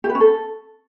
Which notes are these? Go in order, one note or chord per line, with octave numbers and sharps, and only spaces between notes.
G4
B4
C#4
A4